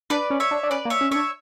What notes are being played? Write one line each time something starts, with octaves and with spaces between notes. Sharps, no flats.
D4 B4 D5
C#4
C#5 E5
D4
D4
C#4 B4 D5
A#3
C#5 E5
C#4
C#4 D4 C#5 E5